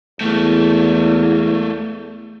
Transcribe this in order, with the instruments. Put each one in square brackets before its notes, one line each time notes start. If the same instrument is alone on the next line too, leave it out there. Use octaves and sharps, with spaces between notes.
[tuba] E2 [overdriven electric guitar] A3 A#3